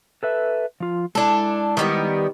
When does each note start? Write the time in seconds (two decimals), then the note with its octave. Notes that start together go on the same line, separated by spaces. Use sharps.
0.23 A4 B4 E5
0.80 F3 F4
1.15 G#3 D4 E4 A4
1.77 D#3 G3 B3